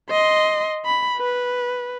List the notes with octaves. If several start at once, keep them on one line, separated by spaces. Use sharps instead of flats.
D#5 C6
B5
B4